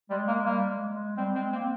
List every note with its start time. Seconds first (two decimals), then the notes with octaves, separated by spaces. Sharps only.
0.10 G3 G#3
0.28 A#3
0.46 G3 A#3
0.69 G#3
0.93 G#3
1.17 G3 C4
1.35 G#3 C4
1.52 A#3 C4